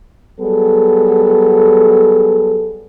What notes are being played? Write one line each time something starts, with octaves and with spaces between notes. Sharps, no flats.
F#3 G3 B3 G#4 A4